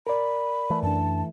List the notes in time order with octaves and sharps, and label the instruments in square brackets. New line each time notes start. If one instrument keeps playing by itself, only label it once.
[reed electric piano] A#4 D5 [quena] B5
[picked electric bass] E3 A3
[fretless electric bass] F#2 D4 [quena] A5